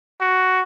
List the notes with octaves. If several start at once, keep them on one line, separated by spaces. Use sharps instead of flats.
F#4